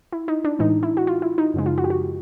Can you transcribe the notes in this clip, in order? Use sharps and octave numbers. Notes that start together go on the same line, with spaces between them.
E4
D#4
D4
A2 E3 G#3 D#4
E4
F#4
F4
E4
D#4
F#2 C#3 F3 G#3
F4
F#4
G4
F#4